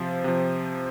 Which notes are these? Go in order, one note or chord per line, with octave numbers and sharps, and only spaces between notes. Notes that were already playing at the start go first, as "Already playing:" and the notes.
Already playing: C3 F3 C5
C3 F3